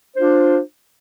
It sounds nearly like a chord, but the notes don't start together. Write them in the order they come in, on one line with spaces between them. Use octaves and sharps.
C5 D4 F4